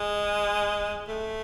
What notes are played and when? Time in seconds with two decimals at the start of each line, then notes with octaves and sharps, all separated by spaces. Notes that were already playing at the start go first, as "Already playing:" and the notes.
Already playing: G#3
1.09 A3